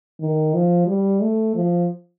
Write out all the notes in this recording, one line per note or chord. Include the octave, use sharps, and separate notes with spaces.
D#3
F3
G3
A3
F3